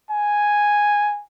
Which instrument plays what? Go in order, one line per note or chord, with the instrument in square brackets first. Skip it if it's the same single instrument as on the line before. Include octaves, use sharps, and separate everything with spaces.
[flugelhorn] G#5